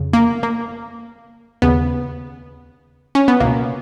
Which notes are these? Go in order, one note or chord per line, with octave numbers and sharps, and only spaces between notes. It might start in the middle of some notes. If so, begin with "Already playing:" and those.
Already playing: F2 C#3
A#3
A#3
D#2 C#3 B3
C#4
B3
C#2 B2 A#3